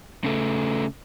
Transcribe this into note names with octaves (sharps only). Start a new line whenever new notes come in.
C#3 A3